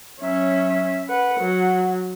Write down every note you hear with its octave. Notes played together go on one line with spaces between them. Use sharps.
F#3 C#4 E5
B4 F#5
F#3